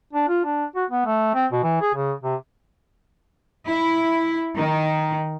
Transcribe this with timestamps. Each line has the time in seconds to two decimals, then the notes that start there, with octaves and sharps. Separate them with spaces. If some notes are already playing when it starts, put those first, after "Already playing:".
0.13 D4
0.28 F4
0.45 D4
0.75 F#4
0.90 B3
1.06 A3
1.35 C4
1.52 B2
1.63 E3
1.82 G#4
1.95 C#3
2.23 C3
3.68 E4
4.56 D#3